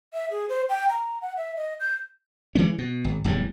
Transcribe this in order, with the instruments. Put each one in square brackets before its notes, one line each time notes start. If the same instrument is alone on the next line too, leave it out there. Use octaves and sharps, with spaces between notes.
[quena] E5
G#4
C5
G5
A#5
F#5
E5
D#5
G6
[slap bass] C#3 E3 G#3 C#4
B2
G#1
D1 E2 G#2 G3